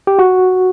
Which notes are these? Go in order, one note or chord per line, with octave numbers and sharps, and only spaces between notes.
G4
F#4